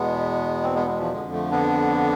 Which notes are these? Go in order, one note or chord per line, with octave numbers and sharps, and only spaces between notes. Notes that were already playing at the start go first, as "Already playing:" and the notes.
Already playing: E2 B2 G#3 B3
C4
G#3 B3
G#3
F3
F2 D3 G#3
F3 A3
B3 D4